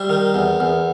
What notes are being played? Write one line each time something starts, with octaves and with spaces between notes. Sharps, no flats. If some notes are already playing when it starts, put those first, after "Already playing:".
Already playing: G3 C5 E5
D#3
E2
E2